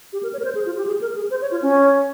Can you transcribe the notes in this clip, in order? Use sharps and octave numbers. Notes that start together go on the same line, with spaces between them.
G4
A#4
C#5
A#4
C5
G#4
F4
G4
G#4
A#4
G#4
C5
C#5
F4
C#4